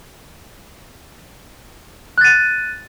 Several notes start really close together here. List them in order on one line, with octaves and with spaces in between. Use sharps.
F#6 A6 D#7